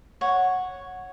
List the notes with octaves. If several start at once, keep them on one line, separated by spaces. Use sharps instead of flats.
C#5 F#5